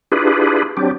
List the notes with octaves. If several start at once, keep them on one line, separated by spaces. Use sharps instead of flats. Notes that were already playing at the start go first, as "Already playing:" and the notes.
D4 E4 F4 G4 G#4 B4
F#3 C4 D4 G4